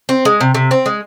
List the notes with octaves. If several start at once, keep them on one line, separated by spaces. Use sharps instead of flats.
C4
G#3
C3
C3
C4
G#3